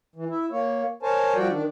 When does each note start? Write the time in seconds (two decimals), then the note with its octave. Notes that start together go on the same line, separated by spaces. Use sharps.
0.16 E3
0.29 E4
0.52 A#3 C#5
1.03 A#4 C5 C#5 G#5 A5
1.35 F3 G3 F#4 D5 G5
1.50 D#3 D4